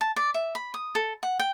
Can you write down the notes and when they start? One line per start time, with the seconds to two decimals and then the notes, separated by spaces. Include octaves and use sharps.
0.01 A5
0.16 D5
0.34 E5
0.55 B5
0.74 D#6
0.95 A4
1.23 F#5
1.39 G5